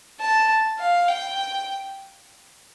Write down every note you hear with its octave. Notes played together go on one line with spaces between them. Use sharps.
A5
F5
G5